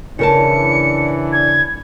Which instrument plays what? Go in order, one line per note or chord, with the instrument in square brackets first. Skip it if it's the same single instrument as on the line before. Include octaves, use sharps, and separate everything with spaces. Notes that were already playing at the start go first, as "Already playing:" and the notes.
[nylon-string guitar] C#3 A#4 A5 [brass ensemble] E3 D4 [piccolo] C#7
[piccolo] G#6